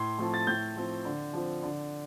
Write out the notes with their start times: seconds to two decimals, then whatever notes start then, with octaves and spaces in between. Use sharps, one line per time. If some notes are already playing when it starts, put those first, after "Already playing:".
Already playing: A2 C6
0.18 F3 A3 C4
0.34 A6
0.47 A2 G6
0.76 F3 C4
1.05 D3
1.33 F3 C4
1.63 D3